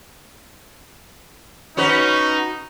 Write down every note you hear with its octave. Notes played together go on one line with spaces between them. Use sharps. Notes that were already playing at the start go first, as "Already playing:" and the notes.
C#4 D#4 F#4 B4